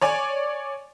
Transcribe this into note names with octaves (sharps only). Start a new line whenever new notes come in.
C#5 D5 G#5